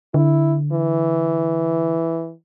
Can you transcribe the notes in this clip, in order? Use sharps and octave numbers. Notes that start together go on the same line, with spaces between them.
D3 E4
E3